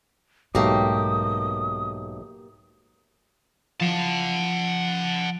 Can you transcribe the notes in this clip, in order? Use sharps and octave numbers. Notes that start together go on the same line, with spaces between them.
B1 G#2 A3 A#3 G4 D#6
F3 F#5 A5